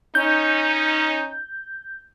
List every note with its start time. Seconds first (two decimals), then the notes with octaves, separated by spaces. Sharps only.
0.15 C#4 D#4 G6